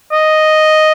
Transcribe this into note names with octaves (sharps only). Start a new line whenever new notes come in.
D#5